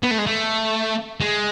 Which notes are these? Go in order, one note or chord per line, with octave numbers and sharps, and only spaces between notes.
B3
A3
G#3
A3
G#3